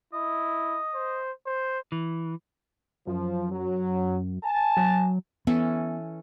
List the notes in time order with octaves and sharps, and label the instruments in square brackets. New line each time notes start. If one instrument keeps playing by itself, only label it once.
[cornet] E4 [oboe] D#5
[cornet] C5
C5
[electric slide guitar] E3
[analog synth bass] F#2 [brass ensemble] F3
[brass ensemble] F#3
G#5 A5
[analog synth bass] F#3
[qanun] E3 C#4 A4 [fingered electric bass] B3